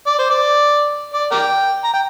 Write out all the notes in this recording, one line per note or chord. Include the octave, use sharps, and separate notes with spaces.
D5
C5
D5
D5
A#4 D5 G5
A#5
G5